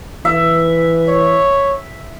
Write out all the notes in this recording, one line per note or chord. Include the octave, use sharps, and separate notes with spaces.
E3 E5
C#5